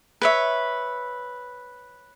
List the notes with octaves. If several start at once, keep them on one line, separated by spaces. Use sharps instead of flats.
B4 C#5 E5